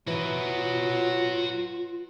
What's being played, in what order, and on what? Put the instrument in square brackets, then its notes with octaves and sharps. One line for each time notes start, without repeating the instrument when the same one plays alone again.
[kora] E3 [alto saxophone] F#3 [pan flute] F4 [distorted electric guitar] F#4 D#5